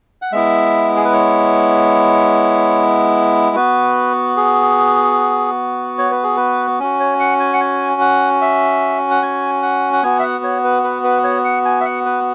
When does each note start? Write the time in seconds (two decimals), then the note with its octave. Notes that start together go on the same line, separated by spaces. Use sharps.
0.22 F#5
0.32 G#3 B3 E4 E5
0.96 G#4
1.05 B4
1.13 C#5
3.56 B3 F#4 B4
4.37 G#4
5.99 C#5
6.11 B4
6.24 G#4
6.37 B4
6.80 C#4 F#4
7.00 C#5
7.20 F#5
7.40 G#5
7.53 F#5
7.60 G#5
8.01 F#5
8.41 E5
9.11 F#5
9.22 G#5
9.63 F#5
9.93 F#5
10.03 B3 F#4 G#5
10.19 E5
10.23 F#5
10.44 C#5
10.64 B4
10.84 B4
11.04 B4
11.24 C#5
11.45 F#5
11.65 G#5
11.81 E5
11.85 F#5
12.05 B4